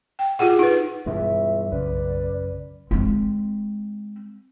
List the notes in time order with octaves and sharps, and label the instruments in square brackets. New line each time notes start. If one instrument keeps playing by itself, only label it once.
[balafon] G5
F4 G4 G#4 F#5
D#4 B4
[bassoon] C#2 [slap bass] G2 B2 E3 [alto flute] E5
[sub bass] B1 [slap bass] F#2 C#3 [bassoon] B4 [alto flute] D5
[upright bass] G#3 C4